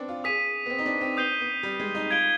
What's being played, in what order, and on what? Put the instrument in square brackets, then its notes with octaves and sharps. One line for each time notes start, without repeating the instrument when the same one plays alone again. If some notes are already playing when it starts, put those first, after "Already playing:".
Already playing: [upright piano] B3 C4 D4
F4
[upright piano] G#4 [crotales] D#6 B6 D#7
[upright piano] B3
C4
D#4
D4
C4
[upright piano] B3 [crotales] D#6 G6 C7 D#7 G7
[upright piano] B3
G3
G#3
D#4
[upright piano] F4 [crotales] G#6 D7 G7